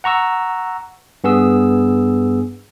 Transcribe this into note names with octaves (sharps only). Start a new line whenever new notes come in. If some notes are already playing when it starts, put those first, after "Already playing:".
F#5 A#5 C#6 E6
G2 B3 G#4 E6